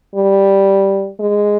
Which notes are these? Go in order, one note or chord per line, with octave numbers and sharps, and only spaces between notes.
G3
G#3